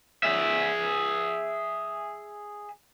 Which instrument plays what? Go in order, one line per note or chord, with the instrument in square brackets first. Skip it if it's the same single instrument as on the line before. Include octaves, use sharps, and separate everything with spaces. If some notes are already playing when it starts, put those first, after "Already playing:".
[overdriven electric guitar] G#4 E5